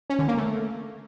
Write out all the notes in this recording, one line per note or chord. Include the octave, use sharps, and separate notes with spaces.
C#4
D3
A#3
A3